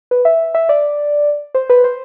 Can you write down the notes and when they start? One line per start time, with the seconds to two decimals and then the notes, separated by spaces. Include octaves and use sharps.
0.11 B4
0.25 E5
0.55 E5
0.69 D5
1.55 C5
1.70 B4
1.84 C5